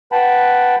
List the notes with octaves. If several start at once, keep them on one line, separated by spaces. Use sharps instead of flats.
B4 F#5 G5 A5 B5